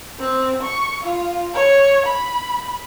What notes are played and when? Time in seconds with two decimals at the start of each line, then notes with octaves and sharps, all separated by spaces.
0.20 C4
0.62 C#6
1.03 F4
1.54 C#5
2.06 B5